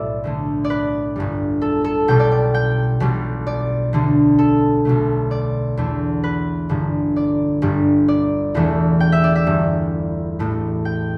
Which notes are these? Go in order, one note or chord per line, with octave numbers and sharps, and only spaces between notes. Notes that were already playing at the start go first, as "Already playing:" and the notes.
Already playing: B1 A2 G3 D5 E5
D2 D3 A3
D5
B4
G1 G2 G3
A4
A4
B1 B2 G3 G5
D5
D5
G5
B1 B2 G3
D5
D2 D3 G3
A4
B1 B2 A3
D5
E2 D3 A3
B4
G1 G2 D3
D5
G1 G2 G3
D5
E1 E2 E3 A3
G5
E5
D5
E5
G1 G2 G3
A1 A2 A3
G5